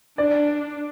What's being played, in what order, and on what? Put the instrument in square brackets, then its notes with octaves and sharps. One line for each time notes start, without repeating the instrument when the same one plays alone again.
[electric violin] D4 [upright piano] D5